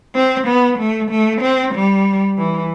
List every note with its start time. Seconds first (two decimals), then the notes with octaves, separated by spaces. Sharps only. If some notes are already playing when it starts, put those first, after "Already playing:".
0.15 C4
0.47 B3
0.79 A3
1.10 A3
1.42 C4
1.74 G3
2.37 E3